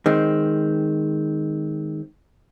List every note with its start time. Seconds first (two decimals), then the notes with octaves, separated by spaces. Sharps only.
0.06 D#3 G#3 C4